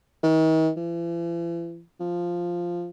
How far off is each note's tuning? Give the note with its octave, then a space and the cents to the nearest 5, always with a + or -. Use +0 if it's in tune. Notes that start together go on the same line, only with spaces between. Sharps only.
D#3 +40
E3 +45
F3 +0